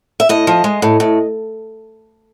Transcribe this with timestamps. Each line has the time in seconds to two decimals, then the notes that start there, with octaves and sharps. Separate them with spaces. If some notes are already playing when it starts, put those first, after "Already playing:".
0.20 E5
0.29 A2 D#5
0.47 F3
0.64 G#3
0.82 A2
1.00 A2